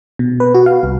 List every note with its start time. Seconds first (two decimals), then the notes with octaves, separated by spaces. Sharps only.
0.19 B2
0.40 B4
0.55 F#4
0.66 F5
0.83 C2